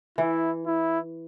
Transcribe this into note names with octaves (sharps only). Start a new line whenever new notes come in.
E3 E4
E4